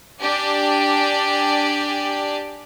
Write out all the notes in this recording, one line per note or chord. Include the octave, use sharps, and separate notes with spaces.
D4 G4 D5 G#5